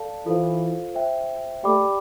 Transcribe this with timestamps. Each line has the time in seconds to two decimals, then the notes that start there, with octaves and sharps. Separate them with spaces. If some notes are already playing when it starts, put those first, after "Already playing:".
Already playing: A4 D5 F5 A5
0.26 E3 F4 A4 C5 F5
0.94 C5 E5 G5
1.64 A3 G4 D5 G5 B5 D6